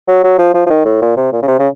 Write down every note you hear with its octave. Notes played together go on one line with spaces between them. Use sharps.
F#3
F#3
F3
F3
F3
D#3
A2
A#2
C3
A#2
C#3
C3
C#3